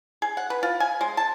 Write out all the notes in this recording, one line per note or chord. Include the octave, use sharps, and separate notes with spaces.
G#4
F#5
B4
F4
G#5
G#3
A5